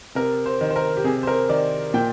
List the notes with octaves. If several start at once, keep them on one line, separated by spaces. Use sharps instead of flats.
C3 A#4
C5
D#3
C5
A#4
G4
C3 G#4
C5
A#4
D#3 D5
A#2 G5